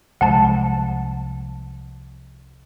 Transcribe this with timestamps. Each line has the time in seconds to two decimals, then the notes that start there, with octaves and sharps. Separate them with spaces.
0.21 C2 F3 G#3 F#5 A5